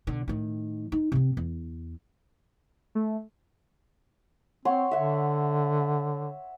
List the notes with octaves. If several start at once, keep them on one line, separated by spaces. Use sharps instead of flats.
B2 D3
A2 D#3
D#4
C3 C4
E2
A3
C4 C#5 F#5 C6
D3 E5 F#5